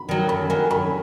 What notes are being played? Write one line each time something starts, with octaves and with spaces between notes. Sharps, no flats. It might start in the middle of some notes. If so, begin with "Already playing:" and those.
Already playing: B5
D#3 F#3
F#2 B5
D#3 F#3 G#5
F#2 B5